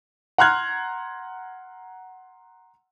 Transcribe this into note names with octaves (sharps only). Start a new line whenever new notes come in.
F#5 A#5 C6 F6 F#6 G#6